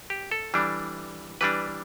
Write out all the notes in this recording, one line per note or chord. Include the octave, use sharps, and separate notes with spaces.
G4
A4
E3 G3 D4
E3 G3 D4 B4